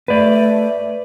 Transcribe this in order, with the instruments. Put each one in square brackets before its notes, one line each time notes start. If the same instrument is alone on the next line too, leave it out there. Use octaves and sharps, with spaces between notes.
[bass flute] A3 [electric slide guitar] B4 D5